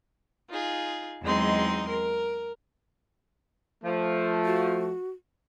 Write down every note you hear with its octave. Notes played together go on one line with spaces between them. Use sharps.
D#4 F4 G#4
E2 F#3 G#3 C4 D#4 C6
A#4
F3 A3
F#4